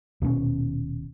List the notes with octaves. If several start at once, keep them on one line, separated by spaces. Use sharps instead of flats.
D#1 B2 B3 C#4